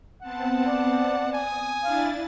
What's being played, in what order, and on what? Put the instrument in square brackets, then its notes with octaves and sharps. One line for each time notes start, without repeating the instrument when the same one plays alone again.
[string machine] B3 C4 A5 [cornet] F#5
[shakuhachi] D5
[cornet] G#5 [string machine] D#6
[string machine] D4 E4 A6 [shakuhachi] F5